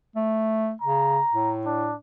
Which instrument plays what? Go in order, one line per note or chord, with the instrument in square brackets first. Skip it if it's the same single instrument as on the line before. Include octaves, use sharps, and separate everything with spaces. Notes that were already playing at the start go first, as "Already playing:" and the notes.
[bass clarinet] A3
[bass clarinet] C#3 [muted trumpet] A#5
[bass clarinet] A2
[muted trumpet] D4